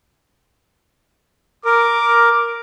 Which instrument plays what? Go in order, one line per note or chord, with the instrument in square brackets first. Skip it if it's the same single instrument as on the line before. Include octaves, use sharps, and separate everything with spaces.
[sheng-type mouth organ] A#4 [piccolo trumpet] D6